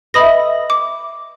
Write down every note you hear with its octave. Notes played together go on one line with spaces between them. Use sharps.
B4 D#5 E5 B5 D#6 A#6
D6